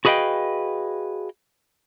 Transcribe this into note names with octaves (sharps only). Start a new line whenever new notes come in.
F#4 G#4 B4 D#5 F5 G5